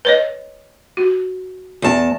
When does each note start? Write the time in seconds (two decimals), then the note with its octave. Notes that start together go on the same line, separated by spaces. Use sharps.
0.05 B4 C#5 D#5
0.97 F#4
1.82 E2 A5